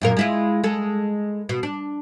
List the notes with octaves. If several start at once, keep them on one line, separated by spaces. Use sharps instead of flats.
F#2 A#2 A#4
G#3 E4 F4
G#3 A4
B2
D4